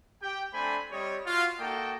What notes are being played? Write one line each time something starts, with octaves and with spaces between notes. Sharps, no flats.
G4 G5
A3 C4 D4 C5 G#5 B5
G3 C4 C#5 D#5
F4 F#4 F5
A#3 D#4 F#4 A4 D#5 G5